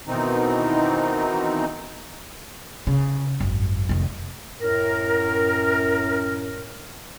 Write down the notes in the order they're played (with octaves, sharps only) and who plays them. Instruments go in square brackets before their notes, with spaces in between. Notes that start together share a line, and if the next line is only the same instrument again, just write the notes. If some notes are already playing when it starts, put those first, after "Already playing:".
[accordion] B2 D#3 E3 C4 D#4
[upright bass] C#3
G#1 F#2
F1 D#3
[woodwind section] F#2 A2 A#4